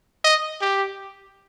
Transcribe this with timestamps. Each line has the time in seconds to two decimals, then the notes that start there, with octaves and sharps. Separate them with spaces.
0.24 D#5
0.61 G4